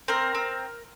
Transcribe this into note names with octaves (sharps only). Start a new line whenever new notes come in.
C4 A#4
C4